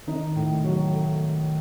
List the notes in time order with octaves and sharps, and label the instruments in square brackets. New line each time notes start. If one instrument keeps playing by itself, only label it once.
[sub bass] D#3 [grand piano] D#4
[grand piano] A2
F#3
A3